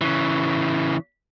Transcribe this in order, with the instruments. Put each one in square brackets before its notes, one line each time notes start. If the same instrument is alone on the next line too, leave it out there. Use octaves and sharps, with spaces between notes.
[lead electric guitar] C#3 E3